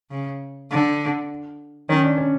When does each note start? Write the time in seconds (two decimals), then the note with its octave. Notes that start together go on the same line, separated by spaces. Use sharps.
0.10 C#3
0.71 D3
1.89 D#3 C#4
2.04 D4
2.18 C#4